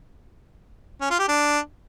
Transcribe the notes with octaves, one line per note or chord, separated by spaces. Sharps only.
C#4
F4
G4
D4